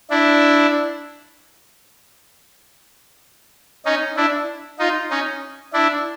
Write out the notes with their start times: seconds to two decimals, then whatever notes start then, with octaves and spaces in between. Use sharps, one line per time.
0.10 D4 E4
3.86 C#4 D#4
4.17 D4 E4
4.79 D#4 F4
5.10 C#4 D#4
5.73 D4 E4